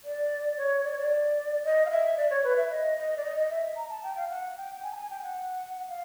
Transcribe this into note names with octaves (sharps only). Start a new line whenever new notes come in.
D5
C#5
D5
C#5
D5
D#5
F5
E5
D5
C#5
B4
E5
D#5
D#5
D5
D#5
D#5
E5
A#5
A5
G5
F5
F#5
G5
G#5
A5
G#5
G5
F#5
F5